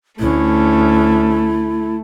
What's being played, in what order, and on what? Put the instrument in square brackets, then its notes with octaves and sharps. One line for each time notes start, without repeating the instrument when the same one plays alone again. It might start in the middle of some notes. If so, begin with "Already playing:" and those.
[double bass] D2 C#4 [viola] A3 [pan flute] E4